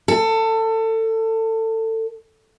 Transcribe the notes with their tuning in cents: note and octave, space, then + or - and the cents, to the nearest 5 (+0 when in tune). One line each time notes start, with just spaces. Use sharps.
A4 +25